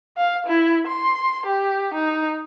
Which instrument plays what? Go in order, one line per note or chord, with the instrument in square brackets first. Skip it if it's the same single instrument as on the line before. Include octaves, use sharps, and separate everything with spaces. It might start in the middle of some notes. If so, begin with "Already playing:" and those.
[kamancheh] F5
E4
C6
G4
D#4